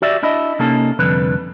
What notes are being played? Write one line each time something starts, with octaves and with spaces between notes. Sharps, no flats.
F#4 G4 D5 E5
D4 E4 D#5
C3 A#3 C#4 D#4 A4
C2 F2 D3 B4